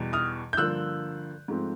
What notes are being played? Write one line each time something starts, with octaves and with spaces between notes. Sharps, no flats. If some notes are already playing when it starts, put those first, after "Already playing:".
Already playing: E2 B2 G3
D#6 F6
G6
G2 D3 F3 A#3 E6 F#6
G#2 F3 A3 C4